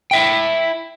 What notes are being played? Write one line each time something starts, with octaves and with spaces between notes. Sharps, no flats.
E4 E5 G5